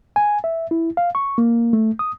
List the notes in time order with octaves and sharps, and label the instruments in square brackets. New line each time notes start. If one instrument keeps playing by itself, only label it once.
[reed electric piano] G#5
E5
E4
F5
C#6
A#3
A3
D#6